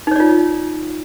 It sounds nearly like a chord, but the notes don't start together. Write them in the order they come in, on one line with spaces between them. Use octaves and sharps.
D#4 C#5 D5 F4